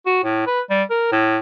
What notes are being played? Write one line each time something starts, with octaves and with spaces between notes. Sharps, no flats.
F#4
A2
B4
G3
A#4
A2